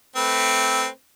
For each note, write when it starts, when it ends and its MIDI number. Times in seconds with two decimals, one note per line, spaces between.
0.16 0.88 57
0.16 0.88 60
0.16 0.88 71